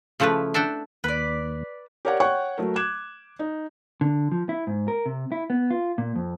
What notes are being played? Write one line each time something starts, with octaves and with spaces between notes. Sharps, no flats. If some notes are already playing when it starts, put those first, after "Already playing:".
C#3 F3 A3 E4 B4
D4 E5 F#5 G5
D#2 B4 D5
G4 A#4 C#5 D5 F#5
C#5 F#5 G5 C#6 F#6
F#3 A3 A#4
D6 F#6 G#6 E7
D#4
D3
F3
E4
G#2
A#4
C3
E4
B3
F4
A#2
F2